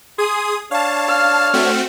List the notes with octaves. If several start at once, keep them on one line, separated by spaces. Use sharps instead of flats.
G#4 C6 D#6
D4 C#5 F5 A5
F6
A3 C4 F#4